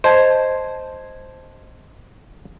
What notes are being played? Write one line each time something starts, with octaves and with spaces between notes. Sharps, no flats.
C5 D#5 A5 G#6